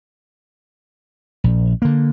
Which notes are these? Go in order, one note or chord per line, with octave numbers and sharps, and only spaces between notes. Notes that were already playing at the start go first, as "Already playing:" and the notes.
A#1
D3 A#3